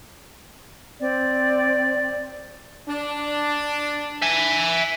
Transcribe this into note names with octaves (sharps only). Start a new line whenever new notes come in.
C4 D5
D4
E5 G#5